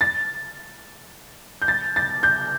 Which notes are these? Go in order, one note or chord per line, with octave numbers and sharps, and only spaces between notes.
A6
G6
A6
A6
G6